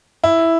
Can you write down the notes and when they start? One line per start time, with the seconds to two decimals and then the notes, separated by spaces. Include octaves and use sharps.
0.24 E4